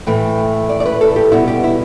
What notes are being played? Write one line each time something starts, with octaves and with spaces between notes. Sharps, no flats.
A2 E3 A3 G5
D5
D5
B4
A4
G4
B2 G3 B3 E4
G4
E4